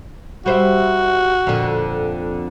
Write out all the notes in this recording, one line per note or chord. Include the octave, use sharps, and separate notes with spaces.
G3 F#4 C5 E5
F2 A#2 D3